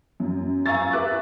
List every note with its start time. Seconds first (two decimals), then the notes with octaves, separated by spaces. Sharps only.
0.20 F#2
0.66 F5 G#5 A#5 C#6 E6 A6
0.93 G4 B4 E5 D6 F#6